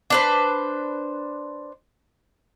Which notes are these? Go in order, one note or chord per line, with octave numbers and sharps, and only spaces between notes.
D4 B4 C5